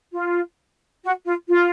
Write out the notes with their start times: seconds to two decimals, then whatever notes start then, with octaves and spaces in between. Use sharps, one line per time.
0.12 F4
1.04 F#4
1.25 F4
1.49 F4